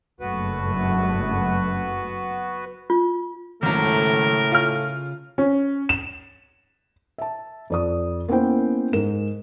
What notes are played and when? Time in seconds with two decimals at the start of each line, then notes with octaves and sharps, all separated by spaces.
0.20 F#1 G2 A3 B3 F#4 B4
2.90 F4
3.63 G#1 F#2 A2 C#3 A3 A#4 A#5
4.52 F4 F6
5.38 C#4
5.89 E7
7.18 E5 A5
7.70 F2 D5 D#6
8.28 A#3 B3 C#4 E4 C5 G5
8.93 G#2 A#4 E7